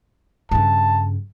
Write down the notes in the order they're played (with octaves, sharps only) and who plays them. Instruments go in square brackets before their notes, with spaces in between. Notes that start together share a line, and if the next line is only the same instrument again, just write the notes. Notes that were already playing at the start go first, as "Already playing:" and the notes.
[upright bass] G2 C#3 [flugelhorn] A5